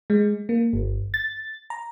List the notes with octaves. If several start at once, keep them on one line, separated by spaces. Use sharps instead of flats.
G#3
A#3
G1
A6
A#5